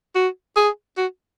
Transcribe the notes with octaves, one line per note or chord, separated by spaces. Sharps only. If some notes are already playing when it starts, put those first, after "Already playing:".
F#4
G#4
F#4